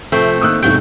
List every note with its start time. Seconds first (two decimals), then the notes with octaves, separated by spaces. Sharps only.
0.12 C3 F3 A3 C4 A4
0.41 D#3 A#3 D#4 D#6 E6 F#6
0.63 B1 G#2 C3 D#3 F#3 C4 F#4 G6